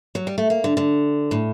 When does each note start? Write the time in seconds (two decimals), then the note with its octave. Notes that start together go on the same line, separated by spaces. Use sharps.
0.15 F#3
0.27 G3
0.38 A3
0.50 A#3
0.64 D3
0.77 D3
1.31 A2